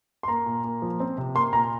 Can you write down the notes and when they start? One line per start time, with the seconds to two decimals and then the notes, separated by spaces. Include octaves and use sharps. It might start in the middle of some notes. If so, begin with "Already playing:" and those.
0.23 C6
0.28 A#3 A#5
0.46 A#2
0.64 A#3
0.82 F3
1.00 C4
1.18 C3
1.35 A#3 C6
1.53 A#2 A#5